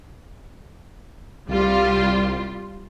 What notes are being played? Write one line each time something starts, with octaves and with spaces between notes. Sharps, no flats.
C2 G3 F4